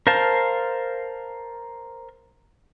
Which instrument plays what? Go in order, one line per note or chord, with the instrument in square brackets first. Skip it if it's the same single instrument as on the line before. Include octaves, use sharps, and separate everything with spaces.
[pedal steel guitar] A#4 C5 F5 A5